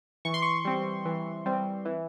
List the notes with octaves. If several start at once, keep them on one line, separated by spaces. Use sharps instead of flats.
E3 C#6
C6
C#6
G3 C4
E3
G3 C4
E3